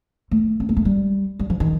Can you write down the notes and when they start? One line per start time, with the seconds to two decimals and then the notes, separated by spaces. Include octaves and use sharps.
0.31 A3
0.60 C4
0.69 A#3
0.77 A3
0.85 G3
1.39 G3
1.50 F3
1.60 D#3